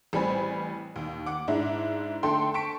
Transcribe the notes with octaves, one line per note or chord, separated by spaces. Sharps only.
A1 G3 C4 G#5 B5
D#2
F#5 D6
G#2 D4 E4
D3 A3 A4 G5 C6
A5 C#6 B6 D7